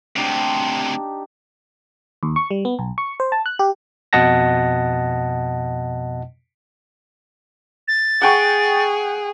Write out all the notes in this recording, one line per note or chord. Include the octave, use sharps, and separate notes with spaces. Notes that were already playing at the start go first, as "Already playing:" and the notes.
D2 C3 D4 D#4 G4
D#2
C#6
G3
B3
B1
C#6
C5
A5
F#6
G4
F2 B2 D#5 F#5 A5 A#6
A6
G#4 F#5 G5 C#6